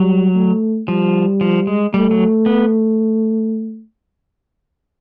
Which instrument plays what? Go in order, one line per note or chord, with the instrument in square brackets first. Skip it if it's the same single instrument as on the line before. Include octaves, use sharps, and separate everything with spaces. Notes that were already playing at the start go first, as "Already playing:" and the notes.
Already playing: [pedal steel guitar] F#3 [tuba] G3
[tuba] A3
[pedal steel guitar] F3 [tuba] G3
[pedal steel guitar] F3
G#3
[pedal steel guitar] G3 [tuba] A3
[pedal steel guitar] F#3
B3